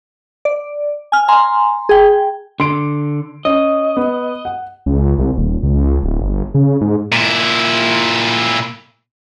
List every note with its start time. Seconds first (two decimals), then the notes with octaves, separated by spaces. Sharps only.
0.45 D5
1.12 G#5 F6
1.28 G#5 A#5 C6
1.89 G#4 G5
2.60 D3 C6 D7
3.45 C#4 D#5
3.97 B3
4.45 F#5
4.86 C#2
5.18 C2
5.37 D#1
5.63 C#2
6.03 D1
6.21 G1
6.54 C#3
6.81 G#2
7.12 A#2 E4